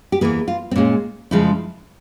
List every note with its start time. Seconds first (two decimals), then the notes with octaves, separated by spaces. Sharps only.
0.12 G4
0.21 E2 E3 A#3 G#4
0.48 F4
0.71 C4
0.76 A#2 G#3 C#4
1.31 F2 C#3 F3 G#3 E4